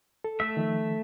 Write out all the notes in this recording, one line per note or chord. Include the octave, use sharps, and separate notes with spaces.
A4
A3 E5
D#3 F3